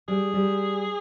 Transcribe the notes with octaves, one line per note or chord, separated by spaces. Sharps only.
G3 G#4
G3